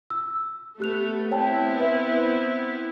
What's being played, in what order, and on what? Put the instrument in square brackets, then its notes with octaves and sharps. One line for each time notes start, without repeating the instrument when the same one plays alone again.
[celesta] E6
[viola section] A3 B3 [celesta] G4 F#6 F7
[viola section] B3 C4 E4 [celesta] C#5 G5 A5
[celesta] B4 C5 E5